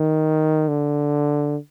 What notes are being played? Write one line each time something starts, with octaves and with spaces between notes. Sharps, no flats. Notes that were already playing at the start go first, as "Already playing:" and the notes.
Already playing: D#3
D3